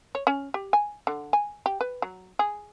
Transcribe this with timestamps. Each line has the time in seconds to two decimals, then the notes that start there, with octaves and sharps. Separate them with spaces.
0.15 C#5
0.27 C#4
0.54 G4
0.73 G#5
1.07 D3
1.33 G#5
1.66 G4
1.81 B4
2.02 F#3
2.39 G#4